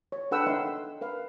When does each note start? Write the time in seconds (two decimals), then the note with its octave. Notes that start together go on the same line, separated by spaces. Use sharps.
0.12 C#5
0.31 D4 A4 B4 F#5 G5 E6
0.47 D#4 A#4 C#5 E5 F5 C6
1.01 A#4 B4 F5